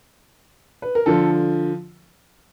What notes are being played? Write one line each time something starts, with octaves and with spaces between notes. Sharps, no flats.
B4
A#4
D3 F3 A4